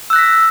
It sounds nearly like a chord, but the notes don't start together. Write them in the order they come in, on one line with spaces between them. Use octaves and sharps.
E6 F#6 A#6 B6